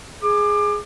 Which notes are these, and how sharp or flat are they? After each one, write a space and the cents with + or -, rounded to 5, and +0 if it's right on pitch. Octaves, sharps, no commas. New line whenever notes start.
G#4 +0 D6 +25